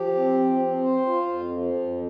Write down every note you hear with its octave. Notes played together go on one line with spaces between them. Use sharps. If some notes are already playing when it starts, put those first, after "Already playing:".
Already playing: F3 G4
C4
F3
C4
C5
F4
F2
F3
F2